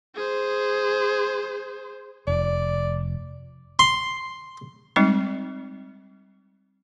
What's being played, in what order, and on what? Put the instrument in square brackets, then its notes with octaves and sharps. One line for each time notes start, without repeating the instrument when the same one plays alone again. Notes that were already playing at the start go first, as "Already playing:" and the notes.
[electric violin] G#4 C5
[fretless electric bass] F1 [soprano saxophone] D5
[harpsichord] C6
[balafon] G3 G#3 C4 D#4 D5